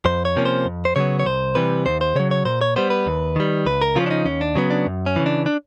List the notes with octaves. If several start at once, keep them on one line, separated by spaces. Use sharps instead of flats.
F2 C5
C#5
C3 F3 A#3 C#4
C5
F2
C5
C#3 F#3 B3 C#5
C#5
C2 C5
C3 E3 G3 B4
D#2 C5
C5
C#3 F#3 C#5
C#5
A#2 C5
C#5
G3 B3 C5
B4
D#2
D#3 G3
C#2 B4
A#4
C#3 F3 A#3 C#4 F4
D4
D#4
D#2 C#4
D4
C#3 F#3 B3
D4
F#2
C#4
C#3 E3
D4
D4